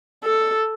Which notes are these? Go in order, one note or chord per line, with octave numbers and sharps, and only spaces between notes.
A4